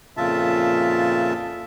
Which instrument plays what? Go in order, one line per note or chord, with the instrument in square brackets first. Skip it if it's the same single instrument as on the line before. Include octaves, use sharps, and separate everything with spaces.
[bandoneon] F2 A#2 C#3 F4 E5 A5